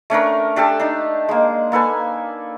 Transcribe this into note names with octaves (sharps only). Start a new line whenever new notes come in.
A3 C#4 D4 A#4
D4 G4 A4 A5
D4 D#4
G#3 A#3
A#3 A4 B4 G#5